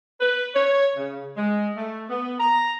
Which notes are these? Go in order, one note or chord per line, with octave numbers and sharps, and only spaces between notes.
B4
C#5
C#3
G#3
A3
B3
A#5